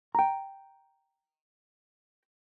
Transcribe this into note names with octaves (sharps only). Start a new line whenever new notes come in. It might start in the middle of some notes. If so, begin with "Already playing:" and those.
G5 A#5